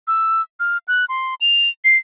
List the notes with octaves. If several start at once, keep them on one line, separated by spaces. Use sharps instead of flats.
E6
F6
F#6
C6
F7
C7